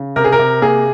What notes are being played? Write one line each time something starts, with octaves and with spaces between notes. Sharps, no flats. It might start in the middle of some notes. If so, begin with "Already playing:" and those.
Already playing: C#3
C3 A#4
G#4
A#4
C3
A#3 G#4